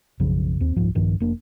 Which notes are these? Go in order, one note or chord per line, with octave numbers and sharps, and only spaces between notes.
B1 F#2 C#3 F3
D#2 C4
D#1 C2 G#2 F3
A#1 G2 D#3 F3
F1 A#3 D4